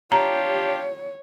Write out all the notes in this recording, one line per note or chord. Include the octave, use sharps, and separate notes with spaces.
D4 F4 G4 C#5 A#5